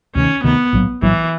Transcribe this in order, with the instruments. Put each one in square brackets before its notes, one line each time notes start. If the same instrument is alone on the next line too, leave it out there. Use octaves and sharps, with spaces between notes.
[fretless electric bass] D2 C3 D#3 [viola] C#4
[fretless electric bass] D2 C3 D#3 [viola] B3
[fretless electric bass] A#1 A2 F#3 A#3
[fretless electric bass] A#1 A2 F#3 A#3 [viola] E3